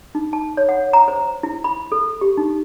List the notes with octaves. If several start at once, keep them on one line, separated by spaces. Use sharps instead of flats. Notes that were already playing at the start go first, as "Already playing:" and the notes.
D#4
A5
C#5
F#5
A#5
C5
E4
B5
A4
G4
D#4